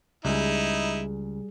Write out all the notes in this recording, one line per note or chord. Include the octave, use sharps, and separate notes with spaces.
C#2 G3 D#4 E4 G#4